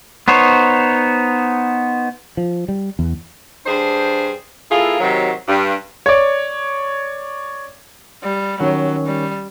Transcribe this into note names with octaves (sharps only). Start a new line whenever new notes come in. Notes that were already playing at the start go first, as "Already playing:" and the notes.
B3 D#4 C5 C#5
F3
G3
E2
G2 D4 G#4 C5
A#3 E4 F4 G#4 A4
C3 D#3 F#3
G2
C#5 D5
G3
D#3 F#3 C#4
G3